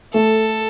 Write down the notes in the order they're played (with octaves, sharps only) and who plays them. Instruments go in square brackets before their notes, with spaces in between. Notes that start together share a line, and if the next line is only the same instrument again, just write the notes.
[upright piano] A3 [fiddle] A4